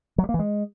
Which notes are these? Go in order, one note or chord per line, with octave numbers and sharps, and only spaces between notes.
F#3
G3
A#3
E3
G#3